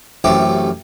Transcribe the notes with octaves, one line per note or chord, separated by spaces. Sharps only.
A1 F#2 C3 A3 G4 G5